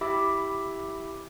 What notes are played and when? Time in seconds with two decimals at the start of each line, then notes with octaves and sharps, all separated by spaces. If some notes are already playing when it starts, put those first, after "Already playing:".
0.01 E4 G4 E5 B5 D6 E6